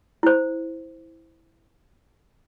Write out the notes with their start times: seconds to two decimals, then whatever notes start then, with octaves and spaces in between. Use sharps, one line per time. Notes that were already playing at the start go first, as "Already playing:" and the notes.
0.23 E4 C5